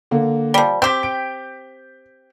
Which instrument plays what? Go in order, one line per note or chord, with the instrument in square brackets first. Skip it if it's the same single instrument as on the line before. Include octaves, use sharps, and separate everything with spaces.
[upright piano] D3 A#3
[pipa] F3 G3
[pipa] C4 G4 [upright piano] G6 B6
[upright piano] D7